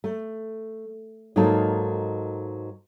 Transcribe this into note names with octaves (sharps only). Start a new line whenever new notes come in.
A3
G#2 F#3 A#3 D#4 F4 A4